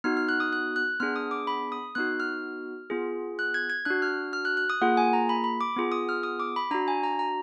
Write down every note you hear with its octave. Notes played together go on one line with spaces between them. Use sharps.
B3 D#4 F#4 F6
F6
F#6
D#6
F#6
F#6
B3 D4 G#4 F6
D#6
D6
B5
D#6
B3 D#4 F#4 F#6
F6
B3 F4 G#4
F#6
G#6
G#6
D4 F#4 F#6
F6
F6
F#6
F#6
D#6
A#3 F4 G#4 F#5
G#5
A#5
B5
B5
D6
B3 F4 G#4
D#6
F6
D#6
D6
B5
D4 F#4 A#5
G#5
A#5
A#5